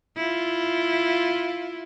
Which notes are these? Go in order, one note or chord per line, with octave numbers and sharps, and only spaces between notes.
E4 F4